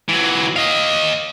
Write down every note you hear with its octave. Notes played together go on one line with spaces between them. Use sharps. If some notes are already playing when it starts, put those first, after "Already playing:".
E3 F#3
D#5 F5